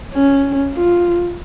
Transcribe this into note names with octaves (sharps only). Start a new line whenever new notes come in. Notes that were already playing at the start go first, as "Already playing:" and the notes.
C#4
F4